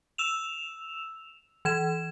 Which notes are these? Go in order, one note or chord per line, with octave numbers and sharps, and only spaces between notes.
E6 E7 F7
E3 G#6 E7